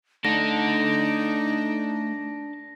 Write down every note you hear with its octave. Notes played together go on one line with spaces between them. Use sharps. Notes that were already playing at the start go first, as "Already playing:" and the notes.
A3 D4 D#4 A4 A#6